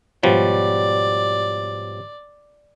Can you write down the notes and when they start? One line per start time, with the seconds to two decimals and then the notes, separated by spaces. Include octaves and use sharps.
0.23 G#2 B2 F3 G3 G4 C#5 D5